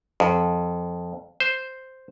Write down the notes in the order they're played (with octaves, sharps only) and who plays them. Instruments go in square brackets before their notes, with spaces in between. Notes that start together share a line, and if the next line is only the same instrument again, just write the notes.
[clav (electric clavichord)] F2
C5